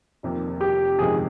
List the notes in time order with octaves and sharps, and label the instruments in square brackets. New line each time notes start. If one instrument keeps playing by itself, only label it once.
[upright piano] F1 F2 C3 D#3 A#3
[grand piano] G4
[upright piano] G1 F2 C3 D#3 G#3 [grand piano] G#4